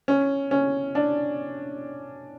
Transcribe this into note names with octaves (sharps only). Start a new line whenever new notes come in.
C#4
C#4
D4